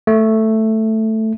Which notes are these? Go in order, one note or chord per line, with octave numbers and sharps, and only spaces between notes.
A3